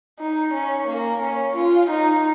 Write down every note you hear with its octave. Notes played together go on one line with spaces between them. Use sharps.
D#4
C#4
A#3
C#4
F4
D#4